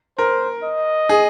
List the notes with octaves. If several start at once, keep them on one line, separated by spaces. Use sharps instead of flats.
A#4 C5
D#5
G#4